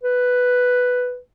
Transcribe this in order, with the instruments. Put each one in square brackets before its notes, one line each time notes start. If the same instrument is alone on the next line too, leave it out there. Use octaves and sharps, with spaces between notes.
[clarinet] B4